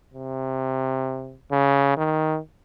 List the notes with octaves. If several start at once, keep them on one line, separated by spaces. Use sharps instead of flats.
C3
C#3
D#3